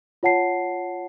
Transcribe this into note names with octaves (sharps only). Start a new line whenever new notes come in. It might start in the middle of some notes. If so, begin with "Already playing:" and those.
F4 C#5 F#5 A5 C7